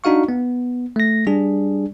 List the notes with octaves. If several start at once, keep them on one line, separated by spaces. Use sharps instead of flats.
D4 D#4 F#4 F5 C#6
B3
A3 A#6
G3 D4 G#4